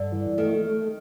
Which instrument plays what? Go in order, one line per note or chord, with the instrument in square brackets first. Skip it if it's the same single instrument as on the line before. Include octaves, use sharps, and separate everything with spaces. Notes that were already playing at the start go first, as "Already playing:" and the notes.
Already playing: [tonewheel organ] G2 [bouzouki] D3
[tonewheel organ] E3
[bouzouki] D#3 [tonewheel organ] A3
[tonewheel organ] A3